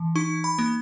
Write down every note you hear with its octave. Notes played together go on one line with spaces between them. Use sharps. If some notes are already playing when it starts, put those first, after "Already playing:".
Already playing: E3
D#4 C#6
B5
A#3